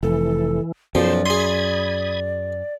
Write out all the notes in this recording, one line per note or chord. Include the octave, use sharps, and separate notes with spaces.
F1 E3 A4
B1 F#2 F3 C5 D5 C6
G#4 B5 C6 D#6 G#6